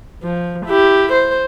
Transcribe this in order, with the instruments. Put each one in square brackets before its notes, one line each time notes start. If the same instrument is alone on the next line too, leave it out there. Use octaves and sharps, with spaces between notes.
[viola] F3
E4 G4
C5